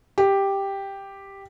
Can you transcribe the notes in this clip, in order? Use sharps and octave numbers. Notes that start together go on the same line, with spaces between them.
G4